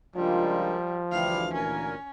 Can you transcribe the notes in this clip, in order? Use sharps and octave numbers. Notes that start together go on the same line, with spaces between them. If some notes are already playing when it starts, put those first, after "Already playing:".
C#2 F3 G3 G#3 A#3 D4 F4
D2 E3 G3 E4 G4 F5
A#2 C#4 A#4 G#5